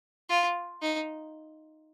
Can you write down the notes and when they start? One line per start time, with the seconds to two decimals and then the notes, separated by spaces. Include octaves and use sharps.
0.29 F4
0.82 D#4